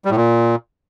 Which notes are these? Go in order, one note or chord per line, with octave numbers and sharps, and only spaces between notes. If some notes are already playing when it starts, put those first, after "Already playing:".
G3
A2
A#2